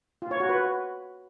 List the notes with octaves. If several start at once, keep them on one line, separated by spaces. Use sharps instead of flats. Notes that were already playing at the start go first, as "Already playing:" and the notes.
F4
C#5
F#4
B4